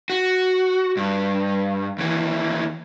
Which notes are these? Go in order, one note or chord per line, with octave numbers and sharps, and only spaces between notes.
F#4
G2
D#2 E3